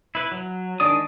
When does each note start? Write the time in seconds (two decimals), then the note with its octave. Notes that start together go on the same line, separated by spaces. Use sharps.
0.15 E4 B4
0.32 F#3
0.80 D#3 G#3 D4 D5 D#6